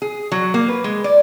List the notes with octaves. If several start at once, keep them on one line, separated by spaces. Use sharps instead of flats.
G#4
F#3
A#3
B4
G#3
D5